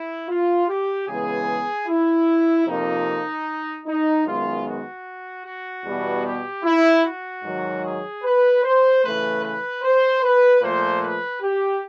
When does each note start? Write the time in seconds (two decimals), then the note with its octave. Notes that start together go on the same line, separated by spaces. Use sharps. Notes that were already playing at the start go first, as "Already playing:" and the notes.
Already playing: E4
0.28 F4
0.68 G4
1.08 C#3 E3 G#3 B3 G#4
1.88 E4
2.67 F2 C3 F3 A#3 D#4
3.86 D#4
4.25 F#2 D#3 G#3 B3 F4
4.66 F#4
5.45 F#4
5.85 E2 B2 G3 B3
6.25 G4
6.64 E4
7.05 F#4
7.44 G#2 D#3 F#3
7.84 G#4
8.23 B4
8.63 C5
9.03 C#3 E3 A3 B4
9.43 B4
9.83 C5
10.22 B4
10.62 A#2 F3 A3 C5
11.02 B4
11.41 G4